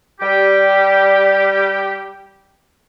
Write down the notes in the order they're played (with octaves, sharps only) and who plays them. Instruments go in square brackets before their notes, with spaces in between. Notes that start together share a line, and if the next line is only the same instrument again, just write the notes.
[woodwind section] G3 G4